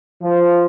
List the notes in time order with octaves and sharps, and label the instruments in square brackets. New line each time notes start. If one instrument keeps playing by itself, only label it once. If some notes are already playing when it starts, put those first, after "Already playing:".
[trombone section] F3